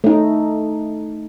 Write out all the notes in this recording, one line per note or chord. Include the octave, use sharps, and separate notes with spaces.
A3 D#4